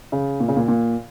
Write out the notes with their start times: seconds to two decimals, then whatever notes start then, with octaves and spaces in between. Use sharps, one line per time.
0.12 C#3
0.40 A#2
0.48 C#3
0.57 A#2
0.68 A#2